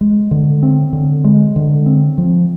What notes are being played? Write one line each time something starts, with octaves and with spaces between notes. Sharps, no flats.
G#3
D3
C4
D3
G#3
D3
C4
F3